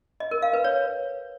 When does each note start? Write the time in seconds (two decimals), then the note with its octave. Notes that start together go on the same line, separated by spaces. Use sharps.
0.20 D#5
0.31 A#4
0.42 F5
0.53 B4
0.64 C#5